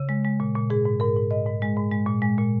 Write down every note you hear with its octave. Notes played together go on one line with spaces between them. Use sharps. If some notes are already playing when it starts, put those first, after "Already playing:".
Already playing: C#3
G#3
G#3
A#2
A#2
G#2 G#4
G#2
G#2 A#4
G#2
G#2 D#5
G#2
G#3
G#2
G#3
A#2
G#3
A#2